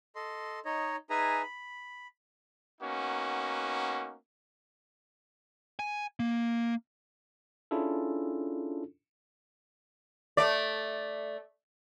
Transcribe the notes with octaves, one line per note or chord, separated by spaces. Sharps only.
A4 D#5 C6
D#4 C#5 D#5
D#4 G#4 B4 E5 G#5 A#5
B5
A#3 B3 C#4 D#4 F#4
G#5
A#3
C#4 D4 E4 F4 G#4 A4
A3 D5